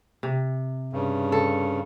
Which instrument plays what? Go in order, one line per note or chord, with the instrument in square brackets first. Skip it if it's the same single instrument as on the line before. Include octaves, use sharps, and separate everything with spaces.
[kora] C3
[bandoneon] G2 C#3
[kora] A4